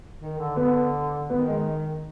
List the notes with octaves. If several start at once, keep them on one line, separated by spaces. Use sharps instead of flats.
D#3
D3
D3 B3
D#3 B3
G#3